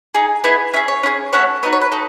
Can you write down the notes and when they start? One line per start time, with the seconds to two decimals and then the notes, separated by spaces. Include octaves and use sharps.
0.15 D#4 G#4
0.44 B3 E4 G#4 D#5
0.74 C#4 G#4 E5
0.88 C#5
1.03 C#4 E4 G#4
1.33 A3 C#4 F#4 A4 C#5
1.63 B3 D#4 F#4 D#5
1.73 C#5
1.82 B4
1.92 D#4 A4